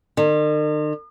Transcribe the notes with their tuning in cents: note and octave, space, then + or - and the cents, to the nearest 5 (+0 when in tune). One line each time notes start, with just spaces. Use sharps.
D#3 -45